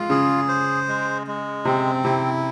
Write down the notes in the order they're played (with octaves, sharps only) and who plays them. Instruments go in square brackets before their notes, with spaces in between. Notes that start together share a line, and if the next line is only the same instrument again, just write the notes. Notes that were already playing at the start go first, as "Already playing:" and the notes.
Already playing: [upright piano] G#3 [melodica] F4
[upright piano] C#3 [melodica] G#4
[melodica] C5
G#3
G#3
[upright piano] C3 [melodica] C4
[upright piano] C3 [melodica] E4